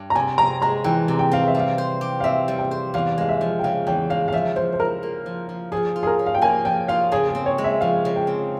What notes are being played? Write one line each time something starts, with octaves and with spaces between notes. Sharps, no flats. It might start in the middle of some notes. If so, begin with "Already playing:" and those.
Already playing: G2
A#5
C3 G#5
C4 A#5
G#3 A#5
E3 G5
C3
G5
C4 F5
E5
G3
F5
C5
G4
F5
C4 E5
G3
G5
C5
E2 F5
G#3 F5
E5
F3
G5
C#3 F5
E2 G5
G#3 F5
F5
F3 E5
F3 C5
C5
E4 A#4
A#3
F3
F3
F3 G#4
F4
G#4
A#4
C#4
F5
G5
A#3 G#5
F3 G5
F4 F5
C#3 G#4
G#4
C4
C#5
G#3
E5
F3 F5
C#3
G5
C4